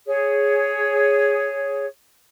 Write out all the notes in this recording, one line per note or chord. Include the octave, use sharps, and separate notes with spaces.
G#4 C#5